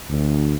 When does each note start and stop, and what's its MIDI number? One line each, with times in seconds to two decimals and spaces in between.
0.10 0.54 38